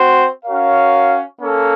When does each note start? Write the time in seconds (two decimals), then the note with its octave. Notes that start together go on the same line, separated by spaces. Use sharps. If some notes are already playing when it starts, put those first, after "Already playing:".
Already playing: C4 F#4 C5
0.46 C#4 F#4 A#4 C#5 F5
1.40 A#3 C#4 A4